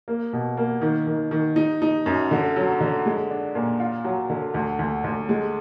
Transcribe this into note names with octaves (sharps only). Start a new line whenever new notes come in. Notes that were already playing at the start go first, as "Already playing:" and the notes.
A#3
B2
A#3
D#3
D#3
D#3
D#4
D#4
F#2
D3
F#3
D3
G#3
D4
A#2
F4
F#3
D3
D2
D2
D2
G#3